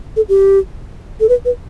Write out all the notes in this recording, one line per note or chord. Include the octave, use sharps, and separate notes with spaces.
A4
G4
A4
B4
B4